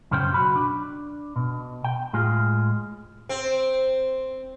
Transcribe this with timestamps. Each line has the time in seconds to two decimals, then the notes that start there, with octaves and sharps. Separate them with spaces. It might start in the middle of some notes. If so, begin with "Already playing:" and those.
0.11 F#2 C#3 C#4 C5 G5
0.31 B1 F#4 B5
0.56 D4
1.36 B2
1.84 G5
2.13 A2 G#3 F4 G#4
3.29 C4